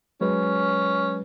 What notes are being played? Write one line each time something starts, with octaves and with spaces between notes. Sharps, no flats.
F#3 G#3 C#4 B4